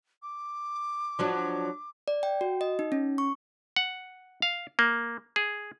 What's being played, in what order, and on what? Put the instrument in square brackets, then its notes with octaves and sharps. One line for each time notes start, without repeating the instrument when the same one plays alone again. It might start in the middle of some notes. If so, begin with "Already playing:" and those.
[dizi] D6
[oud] F3 F#3 D4
[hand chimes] D5
G5
F#4
D#5
D#4
C#4
C#6
[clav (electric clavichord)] F#5
F5
A#3
G#4